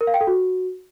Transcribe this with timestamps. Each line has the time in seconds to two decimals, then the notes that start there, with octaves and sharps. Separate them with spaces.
0.01 A#4
0.07 F5
0.14 G5
0.21 A4
0.27 F#4